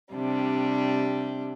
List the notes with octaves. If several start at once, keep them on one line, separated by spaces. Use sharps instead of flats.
C3 G3 D4